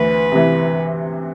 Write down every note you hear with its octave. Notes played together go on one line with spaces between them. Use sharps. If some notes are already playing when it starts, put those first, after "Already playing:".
Already playing: D2 E3 B4
C3 E3